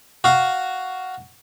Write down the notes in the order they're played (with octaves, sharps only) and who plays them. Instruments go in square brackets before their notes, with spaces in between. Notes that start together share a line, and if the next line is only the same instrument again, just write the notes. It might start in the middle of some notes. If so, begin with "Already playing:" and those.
[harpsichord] F#4 F5